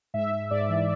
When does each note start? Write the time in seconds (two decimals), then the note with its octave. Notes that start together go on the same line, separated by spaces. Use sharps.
0.14 G#2 E5
0.32 G#2
0.51 G#2 D5
0.69 E3